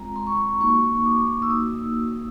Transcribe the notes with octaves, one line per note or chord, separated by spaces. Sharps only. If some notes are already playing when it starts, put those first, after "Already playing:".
Already playing: G#3 C4 F4 A#5
C6
C#6
C6
A#3 D#4 F#4 C#6
D6
E6
A#3 D#4 F#4 D#6